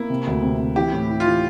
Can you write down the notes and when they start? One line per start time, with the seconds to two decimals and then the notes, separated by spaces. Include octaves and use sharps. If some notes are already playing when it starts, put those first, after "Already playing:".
Already playing: A#3 E4
0.10 C3
0.27 D2
0.42 C3
0.60 C3
0.76 E3 G4
0.93 A2
1.10 E3
1.20 F4
1.25 E3